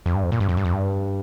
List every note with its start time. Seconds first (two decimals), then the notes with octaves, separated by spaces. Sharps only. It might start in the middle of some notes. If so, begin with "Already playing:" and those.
0.06 F2
0.15 G2
0.23 F2
0.32 A#2
0.40 G2
0.49 F2
0.57 G2
0.65 F2
0.73 G2